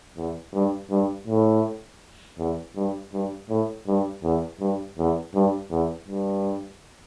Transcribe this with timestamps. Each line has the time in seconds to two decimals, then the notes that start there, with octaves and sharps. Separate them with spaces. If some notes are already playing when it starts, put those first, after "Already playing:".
0.17 E2
0.54 G2
0.91 G2
1.27 A2
2.39 E2
2.76 G2
3.13 G2
3.50 A2
3.87 G2
4.23 E2
4.60 G2
4.98 E2
5.35 G2
5.71 E2
6.08 G2